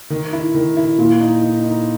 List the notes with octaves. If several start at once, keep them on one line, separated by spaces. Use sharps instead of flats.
D#3
E4
D#3
E4
A#2
D#4
D#4
D#4